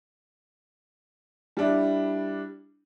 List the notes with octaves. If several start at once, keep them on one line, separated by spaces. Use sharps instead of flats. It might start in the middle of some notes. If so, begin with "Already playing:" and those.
G3 D4 E4